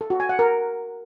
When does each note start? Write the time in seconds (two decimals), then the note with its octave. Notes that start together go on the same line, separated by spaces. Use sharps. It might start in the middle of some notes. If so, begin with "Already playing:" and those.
0.01 A4
0.10 F#4
0.20 G#5
0.29 F#5
0.39 A#4